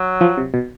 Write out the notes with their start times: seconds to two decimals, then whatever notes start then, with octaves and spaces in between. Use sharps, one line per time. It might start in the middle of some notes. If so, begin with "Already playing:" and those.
Already playing: F#3
0.21 F3
0.37 C3
0.54 B2